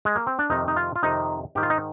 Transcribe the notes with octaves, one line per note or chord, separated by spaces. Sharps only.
G#3
A#3
C4
D4
F2 C3 D#3 D#4
D#4
F4
F4
F2 C3 D#3 D#4
G#2 D#3 G4
F4
D#4